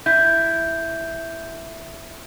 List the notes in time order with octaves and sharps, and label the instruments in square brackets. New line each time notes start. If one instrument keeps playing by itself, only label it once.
[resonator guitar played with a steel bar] E4 [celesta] G6